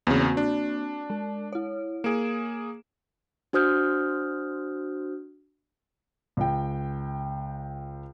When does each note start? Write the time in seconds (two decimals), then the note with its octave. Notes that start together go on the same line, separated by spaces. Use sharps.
0.07 E2 C#3 A#3 C4 F#4
0.37 D4
1.10 G#3
1.52 E4 C#5
2.04 A#3 G#4 D7 E7
3.53 D4 F#4 C5 D#6 F6 G6
6.37 C#2 G5